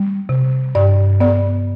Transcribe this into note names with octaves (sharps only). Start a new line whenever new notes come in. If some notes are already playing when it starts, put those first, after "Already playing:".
Already playing: G3
C3
G2 D5
B3 D5